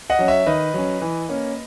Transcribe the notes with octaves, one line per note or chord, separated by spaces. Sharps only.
D#5 F#5
F#3 C#4
C#5 E5
D#3 B4 D#5
F#3 C#4
E3
A#3 C#4